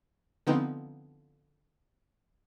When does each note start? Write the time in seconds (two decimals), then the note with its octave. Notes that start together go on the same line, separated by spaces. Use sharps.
0.47 D3 F3 B3 C4 D#4